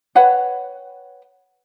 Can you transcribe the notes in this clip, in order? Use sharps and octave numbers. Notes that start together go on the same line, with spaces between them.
B4 C#5 F#5 G5